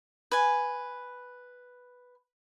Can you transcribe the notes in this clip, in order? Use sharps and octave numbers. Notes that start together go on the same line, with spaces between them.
B4 G#5